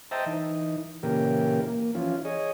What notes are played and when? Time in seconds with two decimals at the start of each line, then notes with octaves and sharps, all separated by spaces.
0.11 C5 D#5 E5 G5 A5 A#5
0.26 E3 D#4
1.03 A#2 C#3 E3 G4 A#4
1.68 A#3
1.95 E3 F3 C#4 F4
2.25 G#4 C#5 D#5